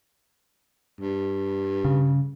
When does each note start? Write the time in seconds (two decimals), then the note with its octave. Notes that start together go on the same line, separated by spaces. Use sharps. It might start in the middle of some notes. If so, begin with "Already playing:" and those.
1.01 G2
1.85 C#3